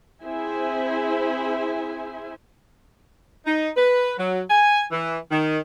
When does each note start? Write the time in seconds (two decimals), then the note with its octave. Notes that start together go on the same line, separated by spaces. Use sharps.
0.24 C4 E4 G#4 C5 E5 G#5
3.46 D#4
3.77 B4
4.18 F#3
4.49 G#5
4.91 E3
5.30 D#3